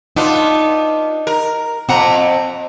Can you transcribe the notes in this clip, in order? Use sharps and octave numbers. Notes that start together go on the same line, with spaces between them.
B3 D4 D#4 F4
A#4
F2 C4 F#5 A#5